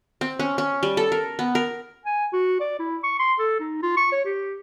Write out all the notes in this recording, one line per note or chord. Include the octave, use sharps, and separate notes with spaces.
C4
C#4
C#4
G3
A4
A#4
B3
A#4
G#5
F#4
D5
E4
C#6
C6
A4
D#4
F4
C#6
C#5
G4